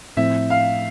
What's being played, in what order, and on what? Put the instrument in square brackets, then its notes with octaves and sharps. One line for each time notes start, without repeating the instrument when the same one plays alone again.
[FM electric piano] A2 F3 A3 C4 E4 [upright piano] E5
[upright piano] F5